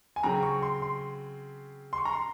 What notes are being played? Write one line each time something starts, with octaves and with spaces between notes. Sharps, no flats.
G#5
C#3 F#3 C4 A#5
C#6
C6
C6
C6
C#6
A#5
C6